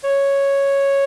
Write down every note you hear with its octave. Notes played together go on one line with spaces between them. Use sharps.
C#5